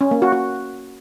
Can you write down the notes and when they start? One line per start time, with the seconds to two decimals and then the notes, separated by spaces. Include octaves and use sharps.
0.01 C#4
0.11 A#3
0.22 F#4
0.33 F#4